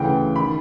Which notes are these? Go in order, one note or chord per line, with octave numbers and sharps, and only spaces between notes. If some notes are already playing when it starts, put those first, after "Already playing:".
Already playing: D2 C#3 E3 G5
D#3 B5